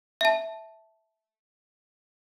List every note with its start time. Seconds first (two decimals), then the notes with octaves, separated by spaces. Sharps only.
0.21 E5 A5